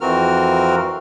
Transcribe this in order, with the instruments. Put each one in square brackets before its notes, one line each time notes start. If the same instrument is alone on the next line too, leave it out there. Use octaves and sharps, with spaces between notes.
[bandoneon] F2 E3 C4 F#4 A#4 F6